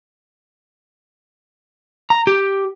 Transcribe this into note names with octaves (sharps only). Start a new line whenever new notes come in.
A#5
G4